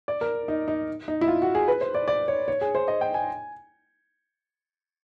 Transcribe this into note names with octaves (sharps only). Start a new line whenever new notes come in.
D5
A#4
D#4
D#4
D#4
E4
F4
F#4
G#4
B4
C5
D5
D5
C#5
C#5
G#4
C5
D#5
G5
G#5